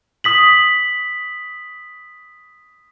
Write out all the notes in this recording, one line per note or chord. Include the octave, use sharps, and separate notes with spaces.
D#6 B6 F#7